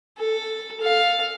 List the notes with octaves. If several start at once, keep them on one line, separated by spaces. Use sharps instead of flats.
A4
A4 F5